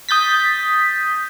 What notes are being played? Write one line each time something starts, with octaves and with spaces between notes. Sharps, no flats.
D#6 G6 A6 B6